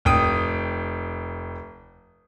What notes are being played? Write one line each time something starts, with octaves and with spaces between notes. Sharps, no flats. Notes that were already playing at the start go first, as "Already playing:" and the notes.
F1 G5 D#6